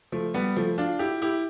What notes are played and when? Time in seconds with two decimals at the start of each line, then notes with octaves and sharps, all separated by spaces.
0.12 F3 A3
0.34 G3 B3
0.56 F3 A3
0.78 D4 F4
0.99 E4 G4
1.22 E4 G4